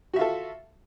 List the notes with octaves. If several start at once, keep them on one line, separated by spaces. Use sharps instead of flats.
F4 F#4 A4 E5